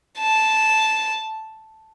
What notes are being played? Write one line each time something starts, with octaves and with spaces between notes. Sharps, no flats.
A5